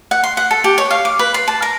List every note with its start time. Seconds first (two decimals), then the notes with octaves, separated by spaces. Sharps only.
0.11 F#5
0.24 C6
0.37 F#5
0.51 A4
0.64 G4
0.78 C#5
0.91 F5
1.05 D6
1.19 B4
1.34 C6
1.48 A5
1.62 A#4